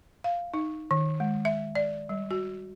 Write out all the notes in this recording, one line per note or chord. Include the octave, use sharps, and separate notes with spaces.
F5
D#4
D#3
G#3
E5
D5
G3
F#4